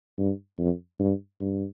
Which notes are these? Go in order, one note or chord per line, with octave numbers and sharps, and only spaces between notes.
G2
F2
G2
G2